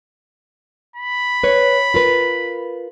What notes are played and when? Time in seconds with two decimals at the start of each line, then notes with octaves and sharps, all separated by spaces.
0.96 B5
1.43 B4 C#5
1.94 F4 A#4 B4